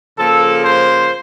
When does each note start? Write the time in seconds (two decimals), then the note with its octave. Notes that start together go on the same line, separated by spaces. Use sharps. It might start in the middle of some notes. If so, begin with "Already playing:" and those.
0.18 C#3 F3 A#3 A4
0.64 C5